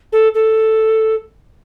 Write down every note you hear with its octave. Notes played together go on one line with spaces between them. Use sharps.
A4
A4